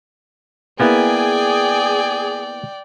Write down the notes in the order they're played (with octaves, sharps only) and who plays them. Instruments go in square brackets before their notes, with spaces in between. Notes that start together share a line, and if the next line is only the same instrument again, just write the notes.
[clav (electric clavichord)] A#3 B3 E4 [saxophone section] G#4 [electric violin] D5 G5